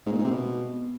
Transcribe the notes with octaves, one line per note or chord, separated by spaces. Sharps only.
G#2
A#2
G#2
C3
B2